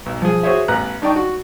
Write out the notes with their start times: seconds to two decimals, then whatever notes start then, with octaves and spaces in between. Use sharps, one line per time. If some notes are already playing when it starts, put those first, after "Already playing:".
0.06 B1
0.22 F3 G#4
0.43 F#4 G#4 C5 C#5 E5
0.68 A1 B3 A#5 F#6
1.02 D4 D#4 D5 G5 C#6
1.16 F#4